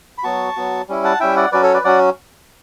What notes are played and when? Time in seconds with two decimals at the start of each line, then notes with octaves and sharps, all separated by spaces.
0.18 B5
0.23 F#3 B3 F#4 A5 C#6
0.56 F#3 B3 F#4
0.88 G3 C#4 E4
1.04 F#5 A5
1.20 G3 C#4 E4 E5 G5
1.36 D5 F#5
1.52 F#3 C#4 F#4 B4 D5
1.63 A4 C#5
1.74 B4 D5
1.84 F#3 C#4 F#4 D5 F#5